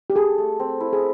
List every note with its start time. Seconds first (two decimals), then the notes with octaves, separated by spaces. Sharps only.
0.10 G4
0.16 G#4 A4
0.38 A3
0.60 C4
0.80 E4
0.93 G#4